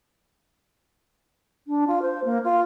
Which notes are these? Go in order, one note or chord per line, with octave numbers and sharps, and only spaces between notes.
D4
F4
C5
A#3
F4